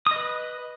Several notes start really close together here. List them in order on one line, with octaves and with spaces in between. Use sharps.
D#6 D#5 B4